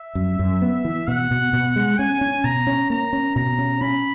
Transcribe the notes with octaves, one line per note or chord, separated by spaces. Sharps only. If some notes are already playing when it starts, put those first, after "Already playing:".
Already playing: E5
F#2
F#2
B3
E3
B2 F#5
B2
B2
G#3
C#4 G#5
C#4
B2 A#5
C#4
A#3 A#5
C#4
B2 A#5
C#4
C#4 B5